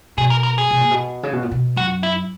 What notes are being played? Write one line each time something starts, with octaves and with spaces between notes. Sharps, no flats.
B2 G#4
A#4
A#4
G#4
B2
A#2
B2
C#3
B2
A#2
B2
F#2 F#4
E4